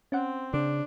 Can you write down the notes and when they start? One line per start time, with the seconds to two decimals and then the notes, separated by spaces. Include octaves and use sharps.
0.12 C4 C#4 F#5
0.53 C#3 D4